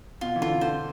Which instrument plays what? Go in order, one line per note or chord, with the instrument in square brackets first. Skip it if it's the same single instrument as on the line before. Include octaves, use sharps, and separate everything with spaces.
[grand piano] B2 [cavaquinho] F4
[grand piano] E3
[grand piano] D3 [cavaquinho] F4
[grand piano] D3 [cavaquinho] C5